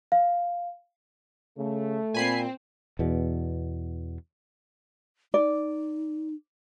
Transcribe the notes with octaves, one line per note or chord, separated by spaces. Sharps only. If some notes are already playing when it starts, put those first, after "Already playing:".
F5
C#3 A3
A#2 C4 G#5 B5 C7
E2 B2
D#4 D5